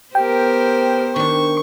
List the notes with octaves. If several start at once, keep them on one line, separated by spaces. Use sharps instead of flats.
B3 G4 A#4 C5 G5
D#3 D4 C#6